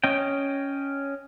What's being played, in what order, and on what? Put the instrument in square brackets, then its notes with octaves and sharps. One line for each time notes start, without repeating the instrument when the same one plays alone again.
[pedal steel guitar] C#4 D#5 G5